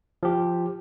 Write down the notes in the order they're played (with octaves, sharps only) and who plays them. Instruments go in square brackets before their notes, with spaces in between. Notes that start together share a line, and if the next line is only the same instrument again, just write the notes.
[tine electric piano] F3 G4